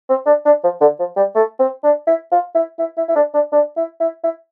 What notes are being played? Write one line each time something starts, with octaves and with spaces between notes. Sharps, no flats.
C4
D4
D4
F3
D3
F3
G3
A3
C4
D4
E4
F4
E4
E4
E4
E4
D4
D4
D4
E4
E4
E4